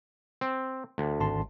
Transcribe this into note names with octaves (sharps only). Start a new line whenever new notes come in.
C4
D2
G#1 A5 C6